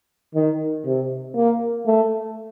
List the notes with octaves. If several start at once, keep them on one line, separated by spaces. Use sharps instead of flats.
D#3
C3
A#3
A3